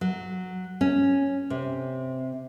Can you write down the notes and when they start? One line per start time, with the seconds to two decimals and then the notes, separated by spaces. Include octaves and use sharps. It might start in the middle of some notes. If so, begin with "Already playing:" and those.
0.01 F#3
0.81 C#4
1.50 C3